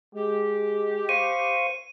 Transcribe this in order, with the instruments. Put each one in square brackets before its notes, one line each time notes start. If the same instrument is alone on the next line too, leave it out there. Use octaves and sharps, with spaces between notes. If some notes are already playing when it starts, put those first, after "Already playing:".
[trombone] G#3 [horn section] G4
[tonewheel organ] C5 F5 C#6 [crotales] D#7